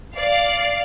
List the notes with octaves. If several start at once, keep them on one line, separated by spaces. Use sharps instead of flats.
D5 F5